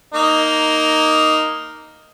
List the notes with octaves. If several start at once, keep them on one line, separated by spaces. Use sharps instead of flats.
A#3 D#4